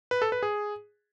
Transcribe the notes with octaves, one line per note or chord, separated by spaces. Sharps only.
B4
A4
B4
G#4